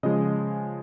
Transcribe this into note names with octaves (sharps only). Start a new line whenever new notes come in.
C#3 F3 G#3 D#5